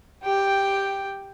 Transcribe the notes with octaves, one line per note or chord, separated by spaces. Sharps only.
G4 G5